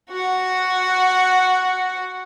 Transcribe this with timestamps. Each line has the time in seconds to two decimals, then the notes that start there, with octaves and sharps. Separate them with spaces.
0.10 F#4 F#5